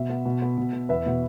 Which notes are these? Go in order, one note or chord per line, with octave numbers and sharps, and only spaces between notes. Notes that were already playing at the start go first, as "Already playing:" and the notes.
Already playing: B2 E5
B3
B2
B3
B2
B3
E2 B4 E5
B2 B3